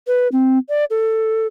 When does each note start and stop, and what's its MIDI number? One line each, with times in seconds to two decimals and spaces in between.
0.07 0.28 71
0.32 0.58 60
0.69 0.85 74
0.90 1.47 69